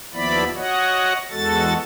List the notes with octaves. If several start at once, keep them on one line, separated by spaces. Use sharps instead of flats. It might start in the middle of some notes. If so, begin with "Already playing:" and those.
D#2 F3 B3 E4 D5 B5
F#4 C#5 D#5 F#5
E2 G#3 F#4 A4 A6